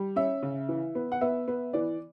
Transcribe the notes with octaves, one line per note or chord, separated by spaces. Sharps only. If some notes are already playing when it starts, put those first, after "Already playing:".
Already playing: G3
C#4 E5
C#3
E3
B3
F#5
B3 E5
B3
E3 D5